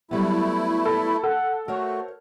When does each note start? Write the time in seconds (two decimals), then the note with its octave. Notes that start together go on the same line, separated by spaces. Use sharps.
0.11 F#3 G3 A3 B3 E4
0.86 A4 B5
1.23 A4 F#5
1.68 A3 F#4 A#4 C5 C#5